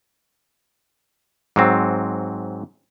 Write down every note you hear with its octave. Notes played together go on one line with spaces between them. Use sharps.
G#2 F#3 C4